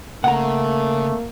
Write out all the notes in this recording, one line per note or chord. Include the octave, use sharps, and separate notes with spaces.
C#3 A3 A#3 F#5 A#5